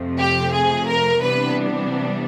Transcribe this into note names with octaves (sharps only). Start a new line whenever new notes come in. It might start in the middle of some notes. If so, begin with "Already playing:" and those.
Already playing: F2 C3 F3 A3
G4
G#4
A#4
C3 E3 G3 B3 D4 B4